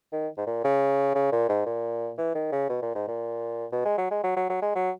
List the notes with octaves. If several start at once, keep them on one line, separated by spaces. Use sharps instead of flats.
D#3
G#2
A#2
C#3
C#3
A#2
G#2
A#2
E3
D#3
C#3
B2
A#2
G#2
A#2
B2
G#3
F#3
G#3
F#3
F#3
F#3
G#3
F#3